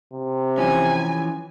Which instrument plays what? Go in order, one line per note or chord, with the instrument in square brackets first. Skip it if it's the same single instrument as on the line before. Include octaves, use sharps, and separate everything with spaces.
[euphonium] C3
[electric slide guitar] E3 F3 C#4 [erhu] G#5